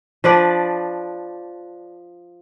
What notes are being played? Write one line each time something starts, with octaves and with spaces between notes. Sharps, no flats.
F3 D4 B4 D5